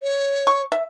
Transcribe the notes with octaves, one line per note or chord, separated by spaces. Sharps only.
C#5
C#6
E5